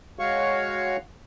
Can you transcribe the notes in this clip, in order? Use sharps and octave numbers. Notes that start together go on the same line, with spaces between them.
G#3 F#4 C#5 F5 C#6